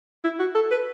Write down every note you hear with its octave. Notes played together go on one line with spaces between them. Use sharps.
E4
F#4
A4
B4